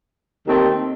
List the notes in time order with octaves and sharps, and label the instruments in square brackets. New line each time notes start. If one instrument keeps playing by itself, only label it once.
[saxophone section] D#2 D#3 A3 C4